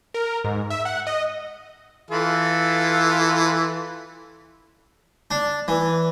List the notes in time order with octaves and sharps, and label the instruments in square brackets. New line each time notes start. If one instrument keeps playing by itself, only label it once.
[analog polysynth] A#4
G#2
E5
F#5
D#5
[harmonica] E3 F4 A4
[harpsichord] D4
E3